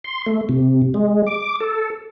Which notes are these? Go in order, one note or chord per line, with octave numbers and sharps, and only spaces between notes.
C6
A3
C3
G#3
D6
A4